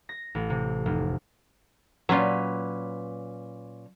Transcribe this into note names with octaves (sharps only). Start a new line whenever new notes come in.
A#6
A1
C3
F1
A#2 F#3 C#4 F4 B4